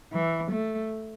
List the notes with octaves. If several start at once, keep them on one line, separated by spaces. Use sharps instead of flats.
E3
A3